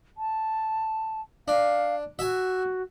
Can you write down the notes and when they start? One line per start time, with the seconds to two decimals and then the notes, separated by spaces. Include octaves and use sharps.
0.17 A5
1.48 D4 F5
2.19 F#4 E5 G#5